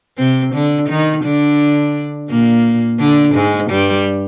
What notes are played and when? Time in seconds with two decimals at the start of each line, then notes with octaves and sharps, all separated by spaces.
0.18 C3 C4
0.54 D3 D4
0.89 D#3 D#4
1.24 D3 D4
2.30 A#2 A#3
3.00 D3 D4
3.35 G#2 G#3
3.70 G2 G3